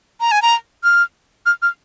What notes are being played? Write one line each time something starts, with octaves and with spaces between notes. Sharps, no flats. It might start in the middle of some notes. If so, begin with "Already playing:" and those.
A#5
G#5
A#5
F6
F6
F6